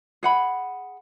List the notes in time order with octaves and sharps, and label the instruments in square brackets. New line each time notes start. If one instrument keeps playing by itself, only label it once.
[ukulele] G#4 F#5 B5